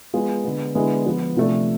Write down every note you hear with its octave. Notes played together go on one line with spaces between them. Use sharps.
G#3 B3 F4 G#4
D3 G#3 B3
D3 G#3 B3 E4 G#4
F3 B3 F4
C3 F3 A3 D4